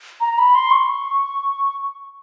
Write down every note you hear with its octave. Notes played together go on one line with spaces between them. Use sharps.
A#5
B5
C6
C#6